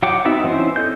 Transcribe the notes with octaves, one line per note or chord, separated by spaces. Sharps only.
F#3 F#5 G5 D6
B3 C4 D#4 F#4 E5
E3 C4 C#4 E4 C5
A4 D#5 G6